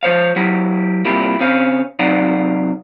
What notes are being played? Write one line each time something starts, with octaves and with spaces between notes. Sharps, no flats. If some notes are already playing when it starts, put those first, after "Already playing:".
F3 C5 C#5 F5
F#3 E4 G4
C3 G3 A#3 E4 F4 G4
C#3 C4 C#4 F5
C3 F#3 D#4 D5 F5 F#5